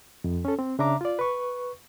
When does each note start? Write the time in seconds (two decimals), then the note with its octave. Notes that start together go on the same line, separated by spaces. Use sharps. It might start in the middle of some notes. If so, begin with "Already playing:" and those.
0.24 F2
0.45 C#4 A4
0.59 C4
0.79 C#3 D4 E5 A#5 D6
1.01 F4 D5
1.19 B4 C#6